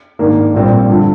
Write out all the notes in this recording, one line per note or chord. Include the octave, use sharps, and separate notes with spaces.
G#2 D#3 A#3 D4
A#1 A#2 G3 C4
G2 D3 F3